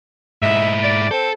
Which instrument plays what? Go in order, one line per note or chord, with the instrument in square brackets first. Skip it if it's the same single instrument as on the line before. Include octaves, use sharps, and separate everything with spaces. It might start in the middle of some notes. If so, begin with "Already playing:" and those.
[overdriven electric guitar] G#2 E4 [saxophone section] D#4 E5
[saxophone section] D5
[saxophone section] C4 C5 [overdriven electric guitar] A4